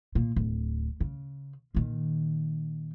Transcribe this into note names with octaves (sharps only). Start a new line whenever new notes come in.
A#2
D1
C#3
A#2 D#3